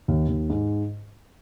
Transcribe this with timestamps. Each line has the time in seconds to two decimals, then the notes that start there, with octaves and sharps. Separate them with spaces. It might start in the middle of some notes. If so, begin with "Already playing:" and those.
0.08 D#2
0.28 D#2
0.50 G#2